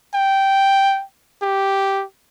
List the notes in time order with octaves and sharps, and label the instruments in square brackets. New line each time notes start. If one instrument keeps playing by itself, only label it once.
[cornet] G5
G4